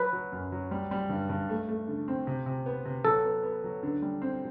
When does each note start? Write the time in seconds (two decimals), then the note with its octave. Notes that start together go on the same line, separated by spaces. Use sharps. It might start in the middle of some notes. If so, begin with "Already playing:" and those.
Already playing: F#3 B4
0.13 F#3
0.32 F#2
0.52 F#3
0.71 G3
0.91 G3
1.10 G2
1.30 G2
1.49 A3
1.69 A3
1.88 D3
2.08 C4
2.27 C3
2.46 C3
2.66 B3
2.85 C3
3.05 F#3 A4
3.25 B3
3.43 B3
3.64 F#3
3.83 D3
4.02 G3
4.22 C4